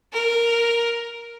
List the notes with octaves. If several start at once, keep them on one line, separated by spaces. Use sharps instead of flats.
A#4